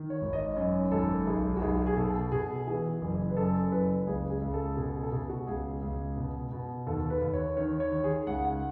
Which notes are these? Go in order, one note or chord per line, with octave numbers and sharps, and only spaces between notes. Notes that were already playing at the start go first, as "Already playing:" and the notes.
Already playing: D#3
C#5
G#1
D#5
F#2 C#5
G#1 A4
B1 G#4
F#4
B1 G#4
F#4
G#4
B2 A4
B2 G#4
E3 G#4
F#1
B4
F#2 A4
F#1 B4
C#2 G#4
G#4
C#2
A4
B2 G#4
G#4
A4
B2 G#4
F#4
C#2 G#4
C#2
B2
B2
D#2 A4
B4
D#2
C#5
D#3 C#5
C#5
D#3
G#4
C#2 F#5
F#5